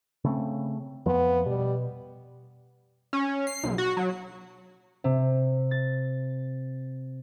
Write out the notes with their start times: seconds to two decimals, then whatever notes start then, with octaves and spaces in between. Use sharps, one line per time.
0.24 C#3 A3 C4
1.06 F2 F3 B3
1.46 B2 G3
3.13 C#4
3.47 C7
3.64 B1
3.78 F#4
3.97 F#3
5.04 C3
5.71 A6